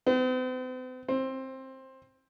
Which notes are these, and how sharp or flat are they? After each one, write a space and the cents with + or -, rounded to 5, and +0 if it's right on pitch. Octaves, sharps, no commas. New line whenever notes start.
C4 -45
C4 +15